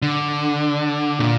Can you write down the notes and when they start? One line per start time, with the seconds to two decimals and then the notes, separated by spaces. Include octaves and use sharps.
0.02 D3
1.19 A#2